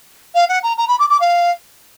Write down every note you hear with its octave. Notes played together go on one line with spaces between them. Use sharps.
F5
F#5
A#5
A#5
B5
D6
D6
F5